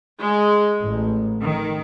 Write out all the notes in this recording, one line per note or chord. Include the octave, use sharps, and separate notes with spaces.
G#3
A1
D#3